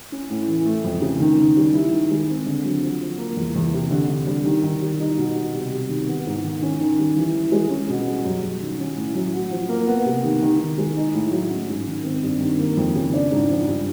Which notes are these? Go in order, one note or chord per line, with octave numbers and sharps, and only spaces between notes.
C#4
A2
E3
A3
F2
C#3
D#3
D#3
G3
E4
D#3
G#3
C4
D3
F#3
F3
F3
A#3
E2
E2
C3
D3
D3
G3
D#3
D#3
G3
D#4
B2
G3
C3
C3
D#3
B3
G#2
D#3
C#4
D#3
G3
E3
E3
G#3
C#4
B2
G3
F#2
F#2
D#3
C#4
A2
F#3
F#4
F3
A#3
B3
C3
D#3
D#3
D#3
G#3
D#4
A2
F#3
C#4
G#2
D#3
C4
G2
D#3
A#3
F2
C#3
D4
G#2
F3
G2